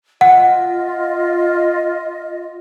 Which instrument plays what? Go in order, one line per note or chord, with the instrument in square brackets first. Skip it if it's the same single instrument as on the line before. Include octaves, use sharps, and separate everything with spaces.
[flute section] F4 D#5 [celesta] F#5